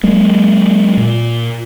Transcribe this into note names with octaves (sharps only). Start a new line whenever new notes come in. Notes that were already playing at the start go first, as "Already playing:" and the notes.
F#3 G#3 A#3
A#2